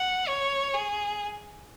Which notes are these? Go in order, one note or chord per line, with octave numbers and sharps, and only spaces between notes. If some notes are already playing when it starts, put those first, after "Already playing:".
Already playing: F#5
C#5
G#4